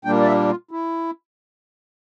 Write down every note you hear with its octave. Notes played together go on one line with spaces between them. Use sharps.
A#2 G3 A#3 D4 G5
D5
E5
F4
E4